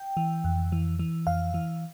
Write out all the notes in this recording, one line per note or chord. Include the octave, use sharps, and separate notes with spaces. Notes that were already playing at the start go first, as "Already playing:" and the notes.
Already playing: G5
E3
F2
E3
E3
F2 F5
E3